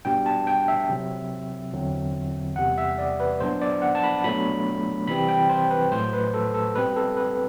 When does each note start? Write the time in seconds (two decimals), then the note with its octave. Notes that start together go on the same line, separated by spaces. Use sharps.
0.05 B2 G3 D4 G5
0.26 A5
0.47 G5
0.68 E5
0.89 C3 F#3 C4
1.73 E2 D3 F#3 C4
2.56 E2 C3 G3 F#5
2.78 E5
2.98 D5
3.20 B4
3.40 B2 F#3 B3 D4 C5
3.61 D5
3.82 F#5
3.95 A5
4.04 B5
4.24 B2 F#3 A3 D4 B5
5.07 C3 E3 G3 C4 B5
5.28 G5
5.50 C5
5.71 B4
5.91 A2 F#3 A3 C5
6.13 B4
6.34 A4
6.54 A4
6.75 B2 G3 C4 B4
6.96 A4
7.17 B4